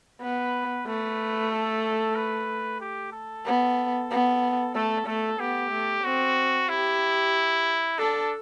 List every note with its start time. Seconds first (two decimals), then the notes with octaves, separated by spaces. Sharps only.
0.22 B3 B4
0.87 A3 B4
1.51 A4
2.16 B4
2.81 G4
3.13 A4
3.45 B3
4.11 B3
4.75 A3 A4
5.07 A3 A4
5.40 B3 G4
5.72 A3
6.04 C4 F#4
6.69 E4 G4
7.98 D4 A4